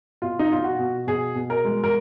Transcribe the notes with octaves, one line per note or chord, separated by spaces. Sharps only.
B2 F4
D#4
B2 F4
F#4
B2
B2 G#4
B2
A#4
G#3
A#4